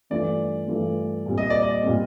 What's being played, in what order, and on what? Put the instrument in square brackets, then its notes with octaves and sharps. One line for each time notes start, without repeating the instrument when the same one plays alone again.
[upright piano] G2 E3 A3 D4 F4 [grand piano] D5
[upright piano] G2 E3 A3 D4 F4
A#2 G3 C4
[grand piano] D#5
D5
D#5
[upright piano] A#2 G3 C4